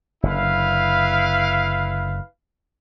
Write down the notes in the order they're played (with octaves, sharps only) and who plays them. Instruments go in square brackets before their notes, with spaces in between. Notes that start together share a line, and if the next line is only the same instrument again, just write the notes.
[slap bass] F#1 D3 [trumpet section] E4 B4 F5